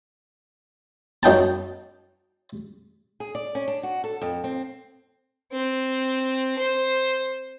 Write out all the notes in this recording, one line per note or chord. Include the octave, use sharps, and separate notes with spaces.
F#2 D#4 G5 A5
G#4
D5
C#4
D4
F#4
A4
F2
C4
C4
C5